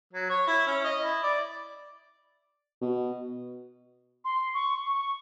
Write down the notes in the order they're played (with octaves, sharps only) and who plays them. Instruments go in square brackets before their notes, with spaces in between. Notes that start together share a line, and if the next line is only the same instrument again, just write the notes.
[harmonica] F#3
C#5
E4
C#4
D#5
E4
D5
[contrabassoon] B2
[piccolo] C6
C#6
C#6